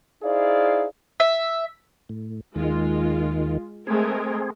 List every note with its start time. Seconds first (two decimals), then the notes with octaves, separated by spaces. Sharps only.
0.23 D#4 E4 G#4 C5 D5 F5
1.20 E5
2.09 A2
2.56 D#2 D#3 G#3 F4
3.87 G#3 A3 C4 G#4 A#4